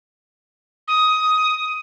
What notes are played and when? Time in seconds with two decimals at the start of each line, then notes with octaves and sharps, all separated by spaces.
0.88 D#6